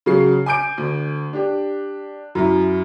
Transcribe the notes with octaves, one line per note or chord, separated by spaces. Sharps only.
C#3 F#3 C7
G#5 D6 G6 D7
D2
D4 G4
F#2 E4